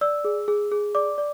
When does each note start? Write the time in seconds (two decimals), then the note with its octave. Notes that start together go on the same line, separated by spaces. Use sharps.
0.01 D5 E6
0.25 G#4
0.48 G#4
0.72 G#4
0.95 D5 D6
1.18 D5